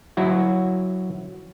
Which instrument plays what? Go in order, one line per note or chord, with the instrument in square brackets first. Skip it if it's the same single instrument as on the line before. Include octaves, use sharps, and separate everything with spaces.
[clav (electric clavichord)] F#3 E4 F#4